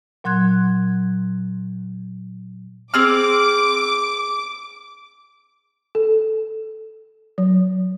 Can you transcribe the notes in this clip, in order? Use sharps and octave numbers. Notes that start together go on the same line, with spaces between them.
A#2 F#3 C6 F#6 G#6
C4 G#4 D6 F6
A4
F#3